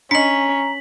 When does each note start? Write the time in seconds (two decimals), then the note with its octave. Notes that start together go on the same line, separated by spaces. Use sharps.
0.11 C#4 D4 D#5 A#5 B6 F#7